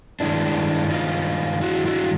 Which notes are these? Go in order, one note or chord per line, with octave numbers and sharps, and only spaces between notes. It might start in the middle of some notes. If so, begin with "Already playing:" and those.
G2 D#3 G#3 D4 E4
D#4 F4
E4 F#4
E4 F#4